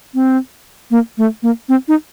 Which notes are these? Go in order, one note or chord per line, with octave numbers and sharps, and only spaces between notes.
C4
A#3
A3
A#3
C4
D#4